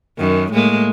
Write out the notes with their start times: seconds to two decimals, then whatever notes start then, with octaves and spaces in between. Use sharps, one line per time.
0.18 F#2 D#3
0.53 A2 G#3 A#3